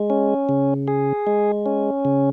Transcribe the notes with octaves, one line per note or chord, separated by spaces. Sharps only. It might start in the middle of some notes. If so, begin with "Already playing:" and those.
Already playing: G#3
C#4
C#3
G#4
G#3
C#4
C#3